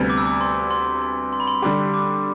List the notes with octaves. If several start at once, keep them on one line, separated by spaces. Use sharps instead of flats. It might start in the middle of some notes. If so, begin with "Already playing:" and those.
Already playing: D2 C3 G3 B3
D6
E6
D6
C6
C6
C6
C6
B5
C6
D3 G3 D4 G4 D6
D6